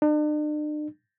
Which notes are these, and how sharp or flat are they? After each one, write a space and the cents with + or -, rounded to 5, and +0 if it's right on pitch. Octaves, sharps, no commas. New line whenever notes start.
D4 +45